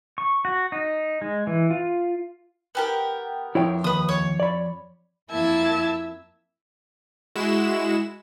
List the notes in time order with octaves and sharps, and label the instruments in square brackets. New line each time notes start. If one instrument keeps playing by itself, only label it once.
[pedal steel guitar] C#6
F#4
D#4
G#3
E3
F4
[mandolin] B3 G4 A#4
[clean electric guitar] F2 [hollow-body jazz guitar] E4 C#5 G5
[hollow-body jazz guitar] D#2 [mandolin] B4 D#6
[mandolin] C#5
[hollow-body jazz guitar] D5 B5
[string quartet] F2 A#3 E4 E5 A5 G#6
[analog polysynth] G#3 E4 F#4 E7